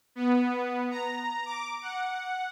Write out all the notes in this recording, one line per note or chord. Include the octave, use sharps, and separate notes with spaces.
B3
A#5
D6
F#5